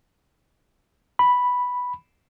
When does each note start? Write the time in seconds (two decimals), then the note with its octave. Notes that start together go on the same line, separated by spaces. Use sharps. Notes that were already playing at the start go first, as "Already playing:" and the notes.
1.19 B5